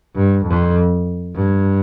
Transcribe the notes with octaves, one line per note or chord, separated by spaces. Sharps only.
G2
F2
G2